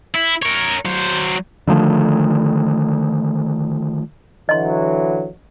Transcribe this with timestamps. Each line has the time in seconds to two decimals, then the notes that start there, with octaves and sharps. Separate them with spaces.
0.14 E4
0.42 A#4 C#5
0.85 F#3 C5
1.67 D3 D#3 F3 A3
4.49 D3 E3 F#3 D#5 C6